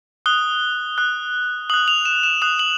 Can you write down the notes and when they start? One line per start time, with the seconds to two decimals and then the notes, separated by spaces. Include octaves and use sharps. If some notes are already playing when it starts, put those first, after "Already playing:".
0.26 D#6 F#6 G7
0.98 D#6 F#6
1.70 D#6 F#6 F#7
1.88 F7
2.05 E7
2.23 E7
2.42 D#6 F#6 F7
2.59 F#7